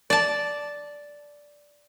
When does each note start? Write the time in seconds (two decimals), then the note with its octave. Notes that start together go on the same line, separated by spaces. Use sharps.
0.10 D5 A5